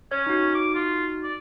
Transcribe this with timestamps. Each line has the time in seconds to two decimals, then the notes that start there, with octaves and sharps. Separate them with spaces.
0.11 C#4 C#5
0.27 D#4 F#4
0.54 D6
0.74 F4
1.23 D5